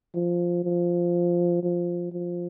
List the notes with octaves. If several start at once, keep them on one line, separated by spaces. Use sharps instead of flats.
F3
F3
F3
F3